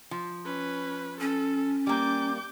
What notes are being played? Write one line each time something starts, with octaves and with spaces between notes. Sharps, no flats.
F3
C#4 B4
C#4 A4
G3 A#3 D6 G6